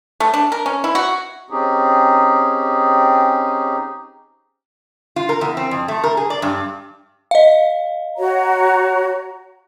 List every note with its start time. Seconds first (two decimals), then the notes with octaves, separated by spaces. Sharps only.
0.20 A3
0.34 D4
0.52 A#4
0.66 C#4
0.84 E4
0.95 F#4
1.50 C4 C#4 D#4 G4 G#4
5.16 F4
5.29 A#4
5.41 E2
5.57 C4
5.71 F2
5.88 A3
6.04 A#4
6.17 G#4
6.30 D5
6.42 G2
7.31 D#5 F5
8.18 F#4 C#5 A#5